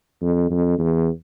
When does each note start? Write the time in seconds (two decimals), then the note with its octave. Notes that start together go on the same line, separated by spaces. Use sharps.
0.22 F2
0.50 F2
0.78 E2